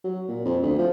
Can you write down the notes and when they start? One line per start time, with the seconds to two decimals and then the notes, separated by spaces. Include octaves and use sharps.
0.04 F#3
0.28 A#2
0.45 F2
0.63 D2
0.79 F3